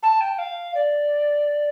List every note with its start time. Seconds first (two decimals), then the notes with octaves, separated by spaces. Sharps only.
0.02 A5
0.20 G5
0.38 F5
0.74 D5